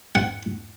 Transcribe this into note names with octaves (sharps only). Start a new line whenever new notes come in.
F#5